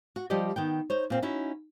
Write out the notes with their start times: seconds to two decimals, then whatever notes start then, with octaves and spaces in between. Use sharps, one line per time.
0.16 F#4
0.30 F3 G3 G4 D5 D#5
0.56 D#3 B3 G5
0.90 D#4 C5 C#5
1.10 A#2 C4 F5
1.22 C#4 D#4 E4 F#4